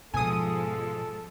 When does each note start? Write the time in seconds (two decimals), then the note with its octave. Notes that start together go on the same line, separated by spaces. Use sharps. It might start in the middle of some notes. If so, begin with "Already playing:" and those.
0.14 G#2 B2 F3 G#3 A4 G#5 D#6